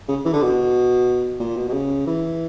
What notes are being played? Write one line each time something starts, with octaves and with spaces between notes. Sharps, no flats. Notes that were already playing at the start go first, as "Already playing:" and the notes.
C#3
E3
D3
B2
A#2
B2
B2
C#3
E3